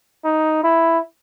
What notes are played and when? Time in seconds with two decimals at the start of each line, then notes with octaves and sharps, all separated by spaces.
0.24 D#4
0.64 E4